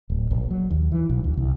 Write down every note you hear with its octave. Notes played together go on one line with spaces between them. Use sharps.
D1
A#1
F#3
D#2
E3
B1
D2
C2